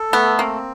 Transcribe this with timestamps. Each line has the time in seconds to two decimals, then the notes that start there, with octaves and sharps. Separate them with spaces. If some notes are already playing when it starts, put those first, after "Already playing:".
Already playing: A4
0.12 A3 B3
0.39 A#3 C4